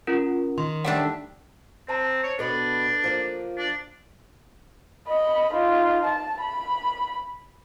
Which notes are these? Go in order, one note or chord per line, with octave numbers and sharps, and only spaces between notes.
C#4 F4 A#4
D#3 C6
G3 A3 D4 F#5 B6
C4 C5 A5 A#5
C#5
B2 D4 A4 B4
F3 A#3
D4
D#5 B5
D#4 F4
A5
B5